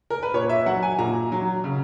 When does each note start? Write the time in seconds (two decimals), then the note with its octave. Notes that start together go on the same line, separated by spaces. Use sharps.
0.10 A#4
0.23 B4
0.34 A#2 C#5
0.50 E5
0.66 F#3 F#5
0.83 G#5
0.99 A#2 A#5
1.32 F#3
1.64 C#3